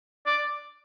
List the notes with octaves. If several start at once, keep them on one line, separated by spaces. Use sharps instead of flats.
D5